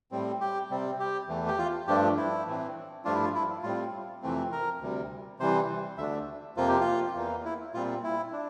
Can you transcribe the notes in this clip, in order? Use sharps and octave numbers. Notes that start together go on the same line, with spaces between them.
A2 G3 C4
G4
C3 G3 C4
G4
E2 E3 A3
G4
F4
G2 F3 A3 D4 G4
E4
A2 E3 A3 C4
G2 F3 A3 D4 F4
E4
F4
E4
A2 G3 C4 F4
F2 C3 E3 A3 C4
A#4
D2 C3 G3
C3 E3 G3 C5
D2 D3 A3 D4 E5
F2 C3 F3 A#3 F4
G4
F4
E2 E3 A#3
E4
A#2 G3 C4 F4
E4
D4